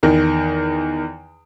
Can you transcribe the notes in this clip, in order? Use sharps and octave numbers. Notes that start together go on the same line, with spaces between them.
E2 D#3